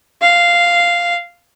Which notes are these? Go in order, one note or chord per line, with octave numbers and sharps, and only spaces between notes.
F5